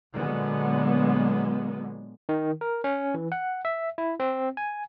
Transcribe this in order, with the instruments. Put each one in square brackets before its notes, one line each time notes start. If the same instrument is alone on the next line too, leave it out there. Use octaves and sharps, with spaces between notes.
[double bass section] A#2 D3 F#3 G#3 B3
[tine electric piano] D#3
A#4
C#4
E3
F#5
E5
E4
C4
G#5